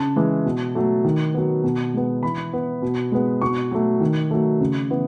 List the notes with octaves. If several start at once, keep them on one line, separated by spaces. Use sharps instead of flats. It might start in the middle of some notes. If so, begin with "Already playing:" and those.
Already playing: C#3 A5
E3 G#3
B2
F#3 A3
D#3
F#3 B3
B2
G#3 B3
E3 B5
B3
B2
G#3 B3
B2 C#6
F#3 A3
D#3
F#3 A3
C#3
E3 B3